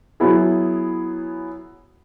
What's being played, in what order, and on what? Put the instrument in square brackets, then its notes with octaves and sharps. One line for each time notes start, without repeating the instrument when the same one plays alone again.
[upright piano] F#3 B3 E4 G#4